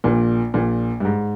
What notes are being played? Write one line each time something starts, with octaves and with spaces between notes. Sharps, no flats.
A#1 A#2
A#1 A#2
G2
G#2